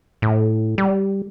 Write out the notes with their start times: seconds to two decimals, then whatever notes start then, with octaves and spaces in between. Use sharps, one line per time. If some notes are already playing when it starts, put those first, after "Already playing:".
0.22 A2
0.78 G3